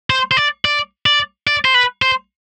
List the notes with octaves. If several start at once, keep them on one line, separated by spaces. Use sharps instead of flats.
C5
C5
D5
D5
D5
D5
C5
B4
C5